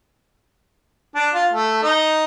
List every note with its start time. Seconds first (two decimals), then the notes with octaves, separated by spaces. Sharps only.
1.15 D4
1.33 F4
1.53 A3
1.83 D#4